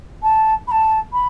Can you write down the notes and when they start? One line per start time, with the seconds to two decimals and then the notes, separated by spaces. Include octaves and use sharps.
0.23 A5
0.67 B5
0.71 A5
1.13 B5